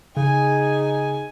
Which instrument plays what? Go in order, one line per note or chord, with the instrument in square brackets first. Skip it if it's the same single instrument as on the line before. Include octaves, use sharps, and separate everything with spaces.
[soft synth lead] C#3 [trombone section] D#4 G#4 [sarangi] G#5